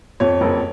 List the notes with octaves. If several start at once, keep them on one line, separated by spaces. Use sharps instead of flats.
F2 C#5
F#1